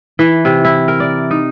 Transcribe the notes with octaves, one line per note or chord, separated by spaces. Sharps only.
E3
C3
E4
A#4
D5
D#4